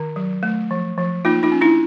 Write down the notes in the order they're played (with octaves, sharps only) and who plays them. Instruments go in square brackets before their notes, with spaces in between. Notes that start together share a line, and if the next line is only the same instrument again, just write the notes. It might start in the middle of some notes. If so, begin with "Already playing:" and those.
Already playing: [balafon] D#3
F#3
A3
F3
F3
A#3 D#4 F4
D#4 F4
C#4
D4 E4